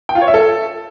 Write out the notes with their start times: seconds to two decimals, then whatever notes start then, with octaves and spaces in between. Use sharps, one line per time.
0.09 G5
0.15 F4
0.21 C#5
0.28 E5
0.34 A4